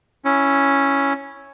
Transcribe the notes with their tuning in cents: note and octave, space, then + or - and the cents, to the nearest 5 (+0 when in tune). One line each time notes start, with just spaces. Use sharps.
C#4 +0 E4 +0